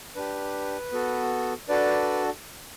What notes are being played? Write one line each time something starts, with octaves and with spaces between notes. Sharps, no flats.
D4 G4 B4
B3 F#4 A4
D4 F#4 A4 B4 D5